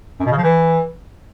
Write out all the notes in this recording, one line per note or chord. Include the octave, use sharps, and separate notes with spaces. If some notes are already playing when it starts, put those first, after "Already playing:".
F#2
B2
C#3
F3
E3